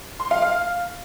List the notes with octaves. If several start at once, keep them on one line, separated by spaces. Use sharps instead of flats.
C6
F5
F5